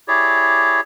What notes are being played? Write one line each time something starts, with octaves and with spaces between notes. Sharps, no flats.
E4 G4 G#4 C#5 D5